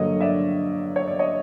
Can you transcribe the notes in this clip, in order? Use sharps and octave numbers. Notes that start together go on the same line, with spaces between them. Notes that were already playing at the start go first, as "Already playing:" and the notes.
Already playing: G2 D3 F#3 A#3 C#5 D#5
D5 E5
C#5
D5
C#5 D#5